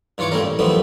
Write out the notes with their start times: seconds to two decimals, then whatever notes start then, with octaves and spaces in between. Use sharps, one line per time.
0.18 G2 E3 F4 C#5 C#6 D6
0.31 G3 A3 A#3 C#4 A#4
0.42 A1
0.59 F#2 E3 F3 G3 A3 B3